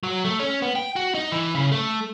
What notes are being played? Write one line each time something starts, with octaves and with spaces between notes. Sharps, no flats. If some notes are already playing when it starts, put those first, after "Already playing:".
F#3
A3
C#4
B3
G5
F#4
D#4
E3
C#3
A3